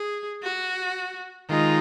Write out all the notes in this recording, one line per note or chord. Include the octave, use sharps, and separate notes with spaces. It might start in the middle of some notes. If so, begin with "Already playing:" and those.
Already playing: G#4
F#4
D#3 G#3 D#4 F4